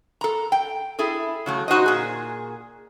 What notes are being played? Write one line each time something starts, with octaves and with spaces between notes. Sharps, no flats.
A4 A#5
G5
E4 G#4 A4
C#3 F#3 A3
D#4 F#4 C5 D#5
A#2 G#4